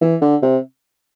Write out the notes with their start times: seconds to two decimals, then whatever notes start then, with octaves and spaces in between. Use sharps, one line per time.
0.01 E3
0.21 D3
0.43 C3